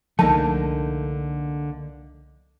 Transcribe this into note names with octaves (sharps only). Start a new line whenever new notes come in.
C2 D3 F3 A3 A#3 D#4 A5